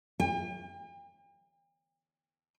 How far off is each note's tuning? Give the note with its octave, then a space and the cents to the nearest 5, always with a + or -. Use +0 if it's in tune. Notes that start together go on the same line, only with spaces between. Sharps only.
G5 +45